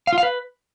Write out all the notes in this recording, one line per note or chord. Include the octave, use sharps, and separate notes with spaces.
F5
F4
F5
B4